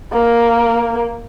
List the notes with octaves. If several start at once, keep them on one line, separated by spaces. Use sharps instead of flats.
A#3 A#4